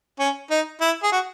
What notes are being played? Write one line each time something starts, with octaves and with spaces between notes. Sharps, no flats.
C#4
D#4
E4
G#4
F#4